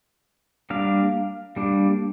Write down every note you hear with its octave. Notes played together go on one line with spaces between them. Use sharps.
G3 A#3 D4 F5
G3 A#3 D4